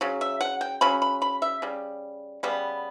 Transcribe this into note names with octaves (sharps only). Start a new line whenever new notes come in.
C#3 F#3
E5
F#5
G5
C#3 F#3 C#4 B5
B5
B5
E5
C#3 G3
C#3 G3 B3